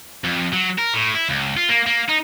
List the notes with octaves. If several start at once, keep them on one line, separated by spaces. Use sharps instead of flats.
F2
F#3
A#4
A2
E4
C#2
F4
A#3
A#3
D#4